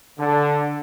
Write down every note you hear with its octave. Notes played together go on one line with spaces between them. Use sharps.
D3